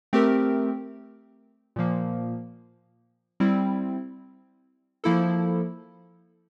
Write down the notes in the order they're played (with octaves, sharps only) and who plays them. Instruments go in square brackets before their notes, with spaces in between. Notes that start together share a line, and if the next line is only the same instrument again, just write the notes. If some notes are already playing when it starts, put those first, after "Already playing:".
[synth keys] A3 C4 G4 A#4
A#2 F3 A#3
G3 C4 E4
F3 A#3 E4 A4